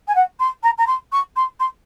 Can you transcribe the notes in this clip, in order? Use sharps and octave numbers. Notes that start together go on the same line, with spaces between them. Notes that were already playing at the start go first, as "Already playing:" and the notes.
G#5
F#5
C6
A#5
A#5
C6
C#6
C6
C6